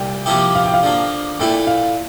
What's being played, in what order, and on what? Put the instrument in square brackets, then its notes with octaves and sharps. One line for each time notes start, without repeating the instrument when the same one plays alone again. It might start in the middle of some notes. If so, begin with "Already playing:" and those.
Already playing: [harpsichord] C2 A#2 [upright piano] G5
[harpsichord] C3 F3 A#3 E4 G4
[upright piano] F5
G5
F5
[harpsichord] D3 F3 A#3
[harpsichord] A#2 A3 E4 [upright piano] G5
[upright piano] F5